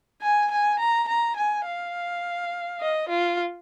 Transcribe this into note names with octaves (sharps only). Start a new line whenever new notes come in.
G#5
G#5
A#5
A#5
G#5
F5
D#5
F4